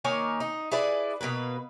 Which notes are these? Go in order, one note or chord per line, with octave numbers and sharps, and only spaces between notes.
D#3 A#3 C#5 G#5
D#4
E4 G#4 B4 D5
B2 D#3 A#3 B4